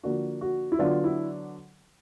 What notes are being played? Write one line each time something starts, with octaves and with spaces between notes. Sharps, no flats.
D3 F3 A#3 D4 F#4
F#4
E4
D3 F#3 B3 D4 F4
E4